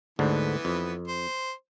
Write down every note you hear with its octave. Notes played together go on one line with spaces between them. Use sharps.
D2 G#2 D3 E3 B3
F2
C5